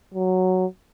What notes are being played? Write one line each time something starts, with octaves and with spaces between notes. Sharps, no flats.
F#3